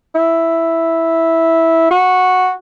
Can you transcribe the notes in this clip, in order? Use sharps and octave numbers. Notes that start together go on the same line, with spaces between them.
E4
F#4